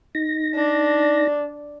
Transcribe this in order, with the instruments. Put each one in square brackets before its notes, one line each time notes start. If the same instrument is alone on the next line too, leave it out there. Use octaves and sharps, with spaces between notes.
[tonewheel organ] D#4 A#6
[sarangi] D4